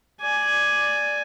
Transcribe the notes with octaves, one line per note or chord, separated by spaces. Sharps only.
D5 G#5